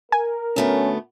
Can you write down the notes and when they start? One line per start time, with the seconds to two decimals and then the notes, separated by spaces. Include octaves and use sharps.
0.12 A#4 G#5
0.56 D2 A3 B3 C#4